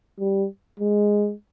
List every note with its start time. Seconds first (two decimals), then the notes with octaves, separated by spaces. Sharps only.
0.19 G3
0.79 G#3